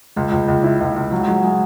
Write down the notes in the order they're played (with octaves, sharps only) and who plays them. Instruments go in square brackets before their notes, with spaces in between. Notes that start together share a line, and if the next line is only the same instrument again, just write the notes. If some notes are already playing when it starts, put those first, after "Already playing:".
[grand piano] C#2 [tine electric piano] G#3
[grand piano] C#2
C#2
E4
C#2
C#2
[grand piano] F#3 [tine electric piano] G#3
[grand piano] F#3 [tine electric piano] G#3
[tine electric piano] G#3 [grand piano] G#4